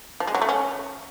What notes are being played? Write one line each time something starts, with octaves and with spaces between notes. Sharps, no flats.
F3
G#3
F#3
A3
C#4